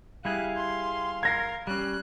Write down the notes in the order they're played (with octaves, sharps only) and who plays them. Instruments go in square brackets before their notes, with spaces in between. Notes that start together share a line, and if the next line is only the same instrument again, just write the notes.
[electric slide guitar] G3 E4 G#4 [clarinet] F5 [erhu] F#6
[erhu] C6
[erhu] A#4 [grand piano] G#6 A#6 C7
[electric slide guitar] G3 C#4 [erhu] F#6